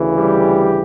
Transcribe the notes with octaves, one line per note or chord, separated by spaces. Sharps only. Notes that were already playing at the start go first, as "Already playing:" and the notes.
Already playing: D2 C#3 E3
G3 G4